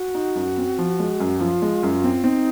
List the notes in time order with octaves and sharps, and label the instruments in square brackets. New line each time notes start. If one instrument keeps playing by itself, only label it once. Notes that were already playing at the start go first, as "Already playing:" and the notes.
Already playing: [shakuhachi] F#4
[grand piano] D#4
F#2
C4
F3
G#3
F#2
[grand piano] F3 [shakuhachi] F4
[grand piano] G#3
F#2
C4
[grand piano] C4 [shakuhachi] D#4